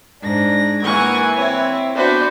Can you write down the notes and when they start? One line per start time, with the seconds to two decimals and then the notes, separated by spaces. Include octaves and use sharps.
0.22 G#2 D4 A#6
0.84 E3 A#3 F#5 G#5 C#6 G#6
1.36 C4 E4 C#5
1.95 B3 D4 F#4 B4 C5